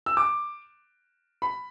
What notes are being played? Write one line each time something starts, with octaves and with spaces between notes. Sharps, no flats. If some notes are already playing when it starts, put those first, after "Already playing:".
E6
D6
B5